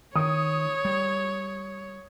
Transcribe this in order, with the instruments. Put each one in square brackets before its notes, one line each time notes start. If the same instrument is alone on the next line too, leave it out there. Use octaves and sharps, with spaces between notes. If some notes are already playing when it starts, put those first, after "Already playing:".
[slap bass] D#3 [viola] C#5 [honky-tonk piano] D#6
[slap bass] G3